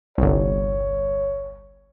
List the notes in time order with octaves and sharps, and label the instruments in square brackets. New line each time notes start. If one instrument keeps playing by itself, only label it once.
[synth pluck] G1 C2 [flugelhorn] C#5